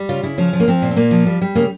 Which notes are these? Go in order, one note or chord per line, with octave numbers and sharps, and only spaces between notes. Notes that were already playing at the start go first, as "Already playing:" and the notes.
Already playing: G3
C#3 F4
C#3 E4
F3 C#4
F3
A#3
F3 C4
A#2
C4
A#2 A#3
F3
G3
G3
C#3 A#3